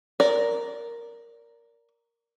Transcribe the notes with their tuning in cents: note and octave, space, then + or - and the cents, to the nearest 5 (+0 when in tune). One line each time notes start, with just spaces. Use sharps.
A#4 +0 D5 -20